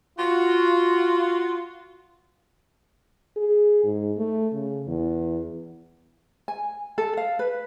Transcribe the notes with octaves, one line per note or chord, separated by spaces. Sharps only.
F4 F#4
G#4
G#2
A3
C#3
E2
G#5
A4
F5
B4